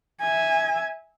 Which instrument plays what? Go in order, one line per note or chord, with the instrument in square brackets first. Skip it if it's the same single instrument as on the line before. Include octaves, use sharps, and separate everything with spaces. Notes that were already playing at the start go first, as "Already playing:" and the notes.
[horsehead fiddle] E5 G#5